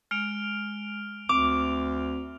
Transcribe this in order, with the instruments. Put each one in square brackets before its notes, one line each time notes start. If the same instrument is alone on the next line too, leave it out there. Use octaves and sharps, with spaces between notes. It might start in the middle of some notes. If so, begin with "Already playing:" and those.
[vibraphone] G#3 [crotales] F6 D7 F7
[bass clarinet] D2 [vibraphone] C4 [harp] D6 [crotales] F7